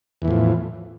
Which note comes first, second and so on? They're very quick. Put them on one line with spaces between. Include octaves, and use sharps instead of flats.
E2 E3 A2 F3